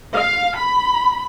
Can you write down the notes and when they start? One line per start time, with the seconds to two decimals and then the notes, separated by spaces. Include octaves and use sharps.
0.14 F5
0.57 B5